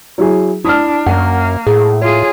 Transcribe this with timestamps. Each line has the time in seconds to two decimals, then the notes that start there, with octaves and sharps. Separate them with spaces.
0.18 F#3 E4 G#4
0.65 D4 E4 D#6 F6
1.06 F#2 A#3 F#5 F6
1.67 A2 G#4
2.02 F4 G#4 C#5